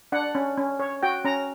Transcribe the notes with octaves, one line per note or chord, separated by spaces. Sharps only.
D4 F#5
C#4
C#4
C#5
F#4 G5
C#4 A#5